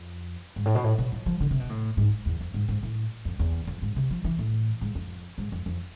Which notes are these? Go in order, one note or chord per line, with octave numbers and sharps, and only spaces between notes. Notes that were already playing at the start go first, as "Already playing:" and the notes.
Already playing: F2
G#2
A2
B2
A2
B2
F3
F3
D3
C3
B2
A2
G#2
E2
F2
G#2
G#2
A2
F2
E2
F2
G#2
C3
F3
E3
A2
G#2
F2
G#2
F2
F2